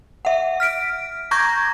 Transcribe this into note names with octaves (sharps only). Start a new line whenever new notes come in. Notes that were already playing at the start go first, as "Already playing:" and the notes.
E5 F#5
F6 B6 D7
A#5 C#6 D6 G6 G#6 A#6